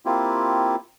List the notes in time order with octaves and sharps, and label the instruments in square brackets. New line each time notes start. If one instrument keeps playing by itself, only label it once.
[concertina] A#3 C4 E4 F4 G4